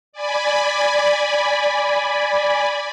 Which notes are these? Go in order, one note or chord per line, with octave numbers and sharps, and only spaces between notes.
D5 G#5 B5